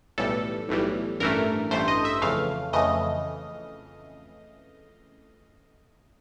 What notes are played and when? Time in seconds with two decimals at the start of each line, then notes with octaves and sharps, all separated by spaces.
0.18 B1 A2 E3 G3 A4
0.69 B1 A2 E3 G3
1.20 A1 G2 E3 A3 A#4
1.71 A1 G2 E3 A3 C5
1.88 D#5
2.05 E5
2.22 F2 C#3 E3 A3 F5
2.73 F2 C#3 E3 A3 D#5